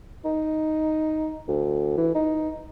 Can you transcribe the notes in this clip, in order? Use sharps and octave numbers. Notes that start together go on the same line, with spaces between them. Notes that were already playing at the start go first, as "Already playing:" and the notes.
D#4
D2
E3
D#4